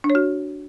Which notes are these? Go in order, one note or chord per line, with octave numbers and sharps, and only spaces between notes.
D4
C#5
F#4